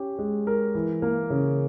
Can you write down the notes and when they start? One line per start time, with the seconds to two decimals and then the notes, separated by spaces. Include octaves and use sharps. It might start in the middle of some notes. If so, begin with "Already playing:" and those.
Already playing: C#4 G4
0.19 G#3
0.47 A#4
0.75 E3
1.02 A#3
1.30 C#3